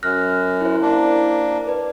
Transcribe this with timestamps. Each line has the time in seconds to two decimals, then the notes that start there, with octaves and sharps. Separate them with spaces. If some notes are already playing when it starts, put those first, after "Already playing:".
0.03 F#2 F6 F#6 A#6
0.61 E4 C5
0.82 A#3 D4
1.67 B4 D5